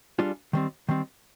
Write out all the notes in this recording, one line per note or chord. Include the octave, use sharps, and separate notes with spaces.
G3 D4 F4 G#4 D5
D#3 G3 C4
D#3 G3 C4